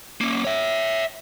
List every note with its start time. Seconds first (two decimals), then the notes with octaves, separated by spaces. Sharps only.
0.21 A#3 C#4
0.45 C#5 E5